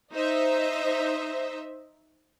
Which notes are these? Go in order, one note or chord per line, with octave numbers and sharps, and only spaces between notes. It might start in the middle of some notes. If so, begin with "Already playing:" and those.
D#4 C5 D#5 E5